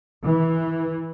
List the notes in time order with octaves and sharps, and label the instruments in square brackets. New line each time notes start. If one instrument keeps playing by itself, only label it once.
[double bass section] E3